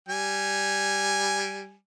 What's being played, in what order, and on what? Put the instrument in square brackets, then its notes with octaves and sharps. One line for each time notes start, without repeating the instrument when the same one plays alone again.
[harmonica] G3 G#5